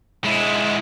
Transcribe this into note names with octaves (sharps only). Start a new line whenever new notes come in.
G#3 E4